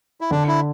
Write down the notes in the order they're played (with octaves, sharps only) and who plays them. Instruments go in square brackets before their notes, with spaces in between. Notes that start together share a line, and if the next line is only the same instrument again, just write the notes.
[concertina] E4
[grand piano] D3 [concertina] D4
[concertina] E4